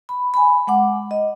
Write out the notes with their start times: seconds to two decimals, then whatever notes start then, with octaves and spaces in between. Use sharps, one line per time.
0.09 B5
0.34 G#5 B5
0.67 G#3 F#5 D6
1.11 D#5